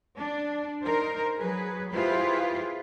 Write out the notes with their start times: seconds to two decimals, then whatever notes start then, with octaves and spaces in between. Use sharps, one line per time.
0.18 D4
0.82 D#4 A#4 C5
1.38 F#3 G#4 B4
1.92 E4 F4 G4 G#4 B4 C5